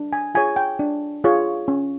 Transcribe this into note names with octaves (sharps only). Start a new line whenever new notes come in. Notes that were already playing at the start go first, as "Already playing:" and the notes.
Already playing: D4
G#5
F4 G#4 C#5 G#5
G5
D4
F4 G#4 C#5
C#4